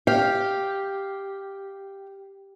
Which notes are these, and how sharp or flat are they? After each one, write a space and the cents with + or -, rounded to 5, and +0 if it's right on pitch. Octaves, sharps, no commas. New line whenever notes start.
G4 +0 F5 +0